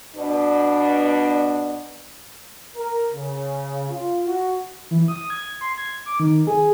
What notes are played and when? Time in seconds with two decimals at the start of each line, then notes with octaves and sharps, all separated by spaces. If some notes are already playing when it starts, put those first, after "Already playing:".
0.16 B2 B3 D4
2.76 A#4
3.13 C#3
3.91 F4
4.26 F#4
4.91 E3
5.08 D#6
5.30 G#6
5.61 C6
5.78 G#6
6.06 D6
6.20 D#3
6.47 G#4